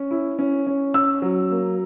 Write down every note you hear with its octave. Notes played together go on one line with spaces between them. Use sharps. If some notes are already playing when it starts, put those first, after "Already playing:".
Already playing: C#4
E4
C#4
C#4
C#4 E6
F#3
A#3